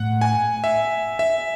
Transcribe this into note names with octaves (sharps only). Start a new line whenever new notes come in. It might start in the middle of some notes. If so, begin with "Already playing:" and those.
Already playing: A2 F#5
G#5
E5
E5